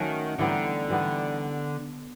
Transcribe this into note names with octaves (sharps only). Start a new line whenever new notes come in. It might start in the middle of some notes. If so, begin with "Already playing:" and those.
Already playing: D#3 F#3 A3 C#4 F#4
D3 E3 G3 B3 D#4
E3 G3 B3 D#4